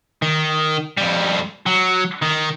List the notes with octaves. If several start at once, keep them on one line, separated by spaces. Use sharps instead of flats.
D#3
F2 G3
F#3
D#3